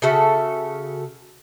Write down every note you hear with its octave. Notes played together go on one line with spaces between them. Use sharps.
C#3 F#4 A4 E5